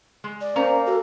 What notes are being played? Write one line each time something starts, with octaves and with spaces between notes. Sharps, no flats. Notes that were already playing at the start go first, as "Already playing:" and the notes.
G#3
D5
A#3 C#4 C5 A#5
F#4 A4